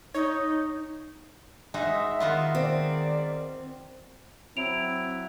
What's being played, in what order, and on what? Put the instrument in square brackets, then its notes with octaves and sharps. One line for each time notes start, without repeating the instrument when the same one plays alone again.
[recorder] D#4 [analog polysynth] C#5
[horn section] G#2 E5 [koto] G#3 D#4 F#4
[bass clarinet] D#3 [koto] B3 F4 F#4
[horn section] G#3 D5 [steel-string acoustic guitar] C4
[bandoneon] F#3 E4 [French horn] C4 [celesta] D7 F7